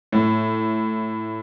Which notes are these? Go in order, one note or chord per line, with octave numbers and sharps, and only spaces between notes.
A2